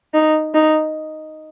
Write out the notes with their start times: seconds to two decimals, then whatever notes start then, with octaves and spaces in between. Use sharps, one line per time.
0.14 D#4
0.54 D#4